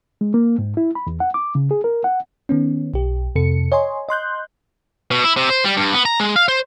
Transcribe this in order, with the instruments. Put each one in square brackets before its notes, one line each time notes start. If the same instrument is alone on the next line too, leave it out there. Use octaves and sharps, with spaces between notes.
[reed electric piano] G#3
A#3
G#2
E4
B5
E2
F#5
D6
C#3
G#4
A#4
F#5
[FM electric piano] D#3 B3 C#4
B1 G4
F2 C3 A4 C#7
C#5 D#5 G#5 C6
D#5 C6 F#6 G6
[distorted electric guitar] B2
E4
C3
C5
G3
G2
B3
A#5
G#3
F5
C5